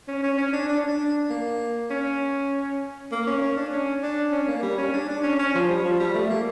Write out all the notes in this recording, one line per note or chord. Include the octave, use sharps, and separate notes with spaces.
C#4
C#4
C#4
D4
D4
D4
A#3
C#4
A#3
C#4
C#4
D4
C#4
D4
C#4
A#3
G3
C#4
D4
D4
C#4
C#4
F3
G3
F3
G3
A3
A#3